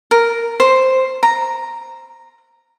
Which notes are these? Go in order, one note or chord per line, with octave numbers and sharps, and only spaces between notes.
A#4
C5
A#5